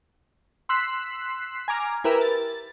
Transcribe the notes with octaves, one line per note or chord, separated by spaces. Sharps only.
C6 E6 F#6 B6 C7
G#5 A#5 D6 F6
E4 G4 A#4 B4 E5 E6
A6